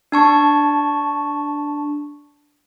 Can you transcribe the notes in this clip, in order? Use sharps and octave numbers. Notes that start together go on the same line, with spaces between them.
D4 A5 C#6